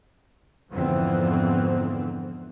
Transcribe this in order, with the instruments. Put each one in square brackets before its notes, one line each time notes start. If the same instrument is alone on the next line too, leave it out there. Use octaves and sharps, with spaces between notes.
[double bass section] F2 G#2 D3 E3 B3 C4